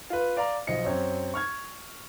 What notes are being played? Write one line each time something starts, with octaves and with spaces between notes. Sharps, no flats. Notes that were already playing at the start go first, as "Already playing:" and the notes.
F4 B4
D5 F5 A#5
B1 F3 D#5 C#7
F#2 C4 C#5
C#6 F6 G#6